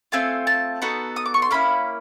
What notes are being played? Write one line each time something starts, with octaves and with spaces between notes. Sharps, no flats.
A3 C4 F4 G#5
A5
B3 D#4 F#4 A4
D#6
D6
C#6
C6
A#3 C#4 E4 B5